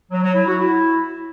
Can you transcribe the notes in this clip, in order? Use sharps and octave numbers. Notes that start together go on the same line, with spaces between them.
F#3
F#3
E4
F#4
E4